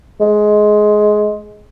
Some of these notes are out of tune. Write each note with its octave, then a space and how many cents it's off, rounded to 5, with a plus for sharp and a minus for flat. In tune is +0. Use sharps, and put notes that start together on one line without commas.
G#3 +15